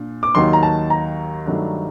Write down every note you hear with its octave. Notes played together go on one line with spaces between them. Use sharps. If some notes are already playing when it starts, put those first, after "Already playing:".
Already playing: A#2 D4
D6
D#2 D#3 F#3 C6
A#5
A5
A#5
G2 D#3 F#3 A3 D4